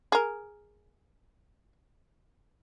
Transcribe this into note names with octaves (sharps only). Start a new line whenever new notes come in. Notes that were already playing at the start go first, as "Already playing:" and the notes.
G#4 A#4